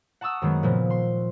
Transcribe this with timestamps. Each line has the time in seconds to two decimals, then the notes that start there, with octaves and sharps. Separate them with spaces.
0.21 F#5 A5 C#6 D#6 E6
0.42 F#2 D#3 G#3 A3 B3
0.63 A#2 C#3 F3 B3
0.90 C6